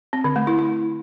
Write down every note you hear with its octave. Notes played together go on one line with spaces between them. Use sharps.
C4
D3
A3
E4
E4